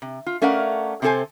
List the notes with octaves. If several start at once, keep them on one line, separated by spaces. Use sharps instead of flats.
C3
F4
A3 C#4 A#4 D5 F5 F#5
C3 C4 D4 A4 C5 G#5